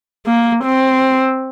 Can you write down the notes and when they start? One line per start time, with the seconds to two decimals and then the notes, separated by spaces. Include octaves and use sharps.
0.26 A#3
0.64 C4